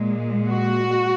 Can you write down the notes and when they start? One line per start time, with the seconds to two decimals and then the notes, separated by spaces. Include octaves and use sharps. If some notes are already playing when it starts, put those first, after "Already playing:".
Already playing: A#2 G#3
0.49 F#4